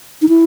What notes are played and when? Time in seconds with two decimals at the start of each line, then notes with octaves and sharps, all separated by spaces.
0.22 D#4
0.29 E4